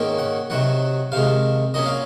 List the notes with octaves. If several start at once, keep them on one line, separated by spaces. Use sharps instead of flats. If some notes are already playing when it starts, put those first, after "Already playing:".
Already playing: G#2 D#3 A#3 C#4
F#5
C3 D#3 F#3 F#5
C3 D#3 G#3 F5
A#2 F#3 C#4 D#5
F5